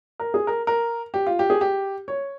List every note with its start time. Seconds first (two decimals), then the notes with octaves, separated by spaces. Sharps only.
0.20 A#4
0.34 G#4
0.47 A#4
0.67 A#4
1.14 G4
1.27 F4
1.39 G4
1.50 G#4
1.61 G4
2.08 C#5